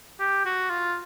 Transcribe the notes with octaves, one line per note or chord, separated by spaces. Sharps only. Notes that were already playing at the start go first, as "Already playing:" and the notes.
G4
F#4
F4